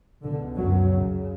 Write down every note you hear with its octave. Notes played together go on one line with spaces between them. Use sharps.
C#2 B2 D3
F#2 F#3
F#2 C#3